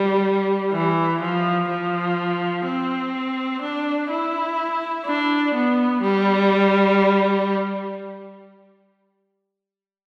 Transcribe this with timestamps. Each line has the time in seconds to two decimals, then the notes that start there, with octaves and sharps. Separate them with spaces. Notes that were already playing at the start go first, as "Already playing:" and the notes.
Already playing: G3
0.72 E3
1.21 F3
1.70 F3
2.66 C4
3.62 D4
4.10 E4
5.05 D4
5.54 B3
6.01 G3